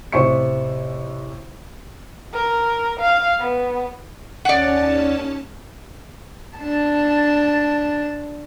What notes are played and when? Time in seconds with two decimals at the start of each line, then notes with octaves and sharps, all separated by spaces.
0.12 A1 C3 C5 E5 C#6 C#7
2.33 A#4
3.00 F5
3.40 B3
4.45 D#2 C#4 D5 F#5 A5
6.59 D4 A5